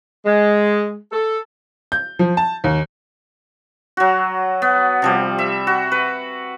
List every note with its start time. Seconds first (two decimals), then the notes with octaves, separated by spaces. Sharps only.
0.24 G#3
1.11 A4
1.92 G6
2.19 F3
2.37 A5
2.64 D#2
3.97 F#3 F#4
4.62 B3
5.02 C3 F3 G3
5.39 E5
5.67 F#4
5.92 B4